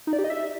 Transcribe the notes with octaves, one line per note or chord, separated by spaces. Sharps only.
D#4
D5
G4
D#5
E5